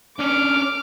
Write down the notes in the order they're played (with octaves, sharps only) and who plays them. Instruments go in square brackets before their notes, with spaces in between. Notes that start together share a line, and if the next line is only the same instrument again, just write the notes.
[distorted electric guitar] C#4 D4 [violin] D6 F6